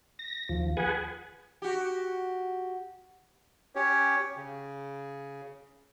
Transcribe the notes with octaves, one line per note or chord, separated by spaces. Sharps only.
A#6
D#2 F3
G#4 B4 F#5 G#5
F#4 G4
C#4 G4 C#5
C#3